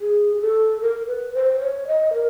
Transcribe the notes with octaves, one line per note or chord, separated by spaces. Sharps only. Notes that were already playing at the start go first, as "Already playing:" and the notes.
G#4
G#4
A4
A#4
B4
C5
C#5
D#5
A#4